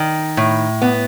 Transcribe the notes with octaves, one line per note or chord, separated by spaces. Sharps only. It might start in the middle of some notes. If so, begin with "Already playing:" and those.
Already playing: D#3
A2
B3